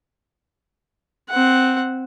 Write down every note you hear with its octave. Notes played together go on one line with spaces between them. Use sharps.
C4 F#5